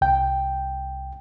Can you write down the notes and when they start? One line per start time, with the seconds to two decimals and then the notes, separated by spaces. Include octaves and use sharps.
0.01 C2 G5